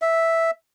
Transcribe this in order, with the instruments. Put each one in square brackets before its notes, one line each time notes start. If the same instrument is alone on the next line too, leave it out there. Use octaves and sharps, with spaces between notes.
[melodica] E5